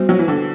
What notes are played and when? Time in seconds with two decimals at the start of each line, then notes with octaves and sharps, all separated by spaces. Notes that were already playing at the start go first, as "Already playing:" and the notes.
Already playing: G3 B3 F#4 C5
0.09 F#3
0.19 E3
0.28 D3